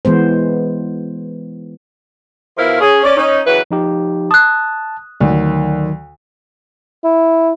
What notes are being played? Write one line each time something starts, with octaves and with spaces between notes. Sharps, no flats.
E3 G#3 B3 C5
B2 F3 E4 A#4 F5
C#4 G#4
C#4 D5
C#4 D#4
C#3 E3 F#3 B4
F3 D#4 G4
A5 D#6 F#6
D2 D#3 F#3
E4